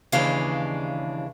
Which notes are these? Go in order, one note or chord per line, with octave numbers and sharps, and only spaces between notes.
D#2 C#3 E3 G#3 D4 F5